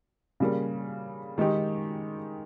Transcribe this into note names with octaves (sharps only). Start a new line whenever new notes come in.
C#3 G3 A#3
D#3 G#3 D#4 G4